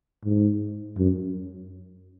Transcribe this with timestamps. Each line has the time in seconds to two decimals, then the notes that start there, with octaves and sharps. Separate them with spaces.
0.25 G#2
0.98 F#2